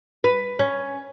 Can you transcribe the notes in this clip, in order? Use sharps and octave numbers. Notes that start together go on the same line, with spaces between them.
B4
C#4